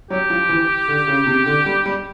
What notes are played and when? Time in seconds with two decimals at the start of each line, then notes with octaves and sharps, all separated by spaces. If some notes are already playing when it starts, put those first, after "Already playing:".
0.10 F#3 G4
0.30 F3
0.49 E3
0.88 D3
1.08 C#3
1.27 C3
1.46 D3
1.66 G3
1.86 G3